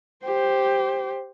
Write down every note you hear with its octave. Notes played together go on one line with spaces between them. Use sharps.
G4 C5